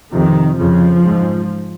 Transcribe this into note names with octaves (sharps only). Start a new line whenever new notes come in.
F2 C3 D#3
F2 C#3 F3
G#2